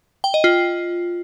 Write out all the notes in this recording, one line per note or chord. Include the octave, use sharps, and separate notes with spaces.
G5
D#5
F4